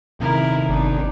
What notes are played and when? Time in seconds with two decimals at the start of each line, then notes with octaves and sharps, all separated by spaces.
0.20 D#1 C3 D#3 E4 A#4
0.69 G1 D4 D#4